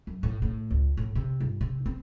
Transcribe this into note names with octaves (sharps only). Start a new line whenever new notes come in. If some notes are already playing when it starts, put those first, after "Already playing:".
F#2
A2
A2
C#2
A2
C3
G1
C3
C4